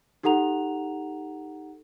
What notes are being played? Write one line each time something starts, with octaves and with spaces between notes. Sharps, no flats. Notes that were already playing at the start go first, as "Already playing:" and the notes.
D#4 G4 A4 F#5 A#5 F7